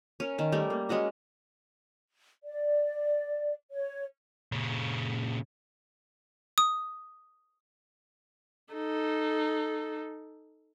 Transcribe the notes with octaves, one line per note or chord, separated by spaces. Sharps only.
C#4 A#4
D#3 A5
G3 A3 A#4
A#3
G#3 C#4 F#4 D#5
D5
C#5
A#2 C#3
D#6
D#4 A4